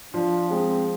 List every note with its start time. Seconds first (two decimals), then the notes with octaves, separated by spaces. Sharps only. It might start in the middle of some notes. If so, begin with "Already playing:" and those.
0.14 F3 D4
0.50 G#3 C4